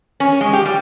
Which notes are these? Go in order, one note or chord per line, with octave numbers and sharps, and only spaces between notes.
C#4
G#3
G4
G3